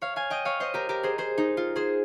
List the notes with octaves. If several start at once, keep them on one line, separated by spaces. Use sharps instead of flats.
C#5 F5
F5 G#5
D#5 G5
C#5 F5
C5 D#5
G4 A#4
G4 A#4
G#4 C5
G#4 C5
D#4
F4
G#4 C5